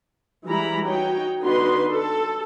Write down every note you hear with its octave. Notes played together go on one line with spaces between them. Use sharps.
E3 G3 G#3 E4 A#5 B5
D#4 F#4 C#5 G5
D3 B3 D#4 F#4 B4 C6
A4